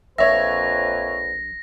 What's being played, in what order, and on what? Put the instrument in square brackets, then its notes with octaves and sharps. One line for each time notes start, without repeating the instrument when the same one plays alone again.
[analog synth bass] A#1 [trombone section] F2 A#2 B4 [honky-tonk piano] C#5 E5 [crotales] A#6